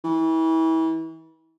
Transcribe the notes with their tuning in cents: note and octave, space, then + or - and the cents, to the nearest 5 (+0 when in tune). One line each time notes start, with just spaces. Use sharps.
E3 -30